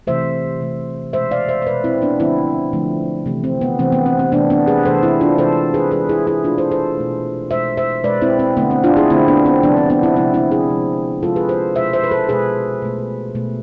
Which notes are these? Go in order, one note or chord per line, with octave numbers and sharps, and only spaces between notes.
C3 E3 A3 C5 E5
C3 E3 A3
B2 G#3 C5 E5
D5 F5
C5 E5
C5
B2 G#3 B4 D5
C4 E4
B3 D4
D3 F3 A3 C4 E4
D3 F3 A3
C3 E3 A3
C4
B3
C3 E3 A3 C4
B3
C4
C4
C3 E3 A3 B3 D4
B3 D4
G#4 B4
C3 E3 A3 A4 C5
C4 E4
D4 F4
C3 E3 G#3 A4 C5
G#4 B4
C3 E3 G#3 G#4 B4
E4 G#4
E4 G#4
B2 A3 D4 F4
A4 C5
A4 C5
B2 A3
B2 G#3 C5 E5
C5 E5
B2 G#3 B4 D5
C4 E4
C4
D3 A3 B3
C4
D4 F4
E4 G#4
D3 A3 C4 E4
B3 D4
C4
C3 F3 G#3 B3 D4
C4
B3 D4
C4 E4
C3 F3 G#3 C4 E4
C4 E4
E4 G#4
C3 F3 G#3
C3 F3 G#3 F4 A4
G#4 B4
A4 C5
B2 G#3 C5 E5
C5 E5
B4
A4 C5
B2 G#3 G#4 B4
B2 A3
B2 A3